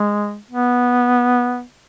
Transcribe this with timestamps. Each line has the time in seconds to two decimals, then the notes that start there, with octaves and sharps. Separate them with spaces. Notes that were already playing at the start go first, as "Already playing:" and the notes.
Already playing: G#3
0.51 B3